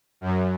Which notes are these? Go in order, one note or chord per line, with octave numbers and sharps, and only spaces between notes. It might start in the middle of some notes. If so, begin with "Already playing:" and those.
F#2